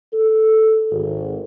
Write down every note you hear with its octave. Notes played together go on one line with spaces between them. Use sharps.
A4
G#1